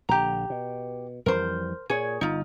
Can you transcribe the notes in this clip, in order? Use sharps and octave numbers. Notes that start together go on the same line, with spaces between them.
A#1 D3 G4 A#5
B2
F2 E3 G3 A#4 C5
A#2 G#4 C#5
G1 D#4 F4